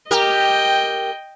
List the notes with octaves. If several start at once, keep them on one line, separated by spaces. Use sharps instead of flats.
G4 A#4 D#5 G5